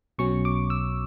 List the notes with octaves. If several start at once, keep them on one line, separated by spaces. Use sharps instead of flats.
B1 B2 F#3 C#4 C#6
D6
E6